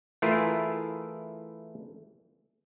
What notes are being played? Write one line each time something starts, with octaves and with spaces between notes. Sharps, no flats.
E3 A3 E4 F4 G#4 A#4